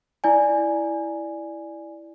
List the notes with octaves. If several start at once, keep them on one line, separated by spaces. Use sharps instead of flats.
E4 D5 G#5